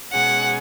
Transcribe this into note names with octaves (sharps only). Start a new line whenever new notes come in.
B2 G#3 C#4 G#4 F#5